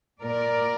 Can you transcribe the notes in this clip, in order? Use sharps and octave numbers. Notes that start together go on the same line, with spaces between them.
A#2 A#4 D5